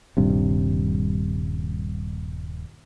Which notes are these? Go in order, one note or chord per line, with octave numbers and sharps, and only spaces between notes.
D#1 G2 C3